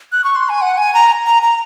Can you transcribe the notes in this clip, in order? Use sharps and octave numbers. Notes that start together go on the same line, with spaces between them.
F#6
C#6
C6
G#5
F#5
G#5
A#5
A#5
A#5